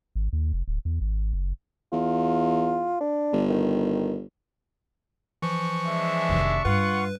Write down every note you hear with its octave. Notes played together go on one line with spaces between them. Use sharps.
G#1
D#2
F1
D1
E2
G#1
F#1
E2 F4
D4
G1
D#3
E3 F3 C#6
G#3 D4 E5
F1 D#3
G2 F4 B4 F#5